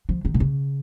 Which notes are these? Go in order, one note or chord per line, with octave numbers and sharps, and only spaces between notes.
F3
D#3
C3
C#3